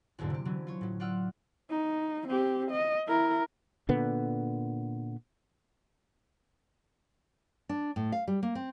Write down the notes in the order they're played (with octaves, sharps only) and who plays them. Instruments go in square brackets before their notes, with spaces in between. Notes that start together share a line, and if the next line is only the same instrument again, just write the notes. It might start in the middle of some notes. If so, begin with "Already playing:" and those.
[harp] B1 E2 G#2 D3 A#3
C3 G4
D3 E3 F#3 C#4
F4 C#5
A2 F#3
F4 D5 F#5 E6 F6
[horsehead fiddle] D#4
C4 G4
D#5
E4 A#4
[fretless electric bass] A#2 D3 B3
[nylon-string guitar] D4
A2
F5
G3
A#3
C4